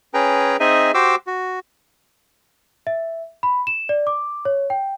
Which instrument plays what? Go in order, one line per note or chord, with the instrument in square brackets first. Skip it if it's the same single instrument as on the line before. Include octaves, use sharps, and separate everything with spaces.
[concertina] C#4 G#4 B4 G5 A#5
C4 D#4 G#4 D#5 E5 G#5
F#4 G4 C5 D6 E6
F#4
[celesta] E5
B5
E7
D5
D6
C#5
G5